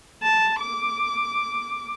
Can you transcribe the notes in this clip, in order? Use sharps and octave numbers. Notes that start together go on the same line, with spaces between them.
A5
D6